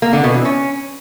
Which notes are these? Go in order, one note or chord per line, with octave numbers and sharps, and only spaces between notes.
A#3
D3
B2
E3
C#4